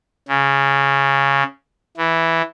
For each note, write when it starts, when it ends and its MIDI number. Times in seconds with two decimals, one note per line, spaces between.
0.28 1.43 49
1.97 2.42 52